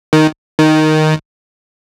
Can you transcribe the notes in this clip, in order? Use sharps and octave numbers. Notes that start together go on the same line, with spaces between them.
D#3
D#3